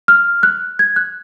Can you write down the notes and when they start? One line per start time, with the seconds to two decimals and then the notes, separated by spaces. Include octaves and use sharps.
0.08 F6
0.43 F#6
0.79 G#6
0.96 F#6